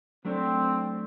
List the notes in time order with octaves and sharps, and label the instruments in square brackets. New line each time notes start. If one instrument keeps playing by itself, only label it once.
[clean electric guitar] F#3 A3 D4 [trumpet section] C4